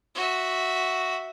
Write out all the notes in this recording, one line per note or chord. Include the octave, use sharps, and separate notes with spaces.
F#4 E5